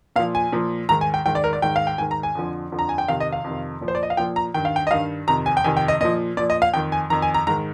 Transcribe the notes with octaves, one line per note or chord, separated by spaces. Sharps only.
A#2 F3 F5
G#5
A#2 F3
G#2 D#3 A#5
G#5
G5
G#2 D#3 G5
D5
A#4
D5
G#2 D#3 G5
F5
G5
G#2 D#3 G#5
A#5
G#5
F2 D3 F3
F2 D3 F3
A#5
G#5
G5
F2 C3 D#3 F5
D#5
F5
F2 C3 D#3
A#2 F3
C5
D5
D#5
F5
A#2 F3 G5
A#5
G2 D#3 G5
F5
G5
D#5
G2 D#3 F5
F2 C3 D#3 A#5
G#5
G5
F2 C3 D#3 G#5
G5
D#5
A#2 F3 D#5
A#2 F3 D5
D#5
F5
F2 D#3 G5
G#5
F2 D#3 A#5
G#5
A#5
G#2 D#3 A#5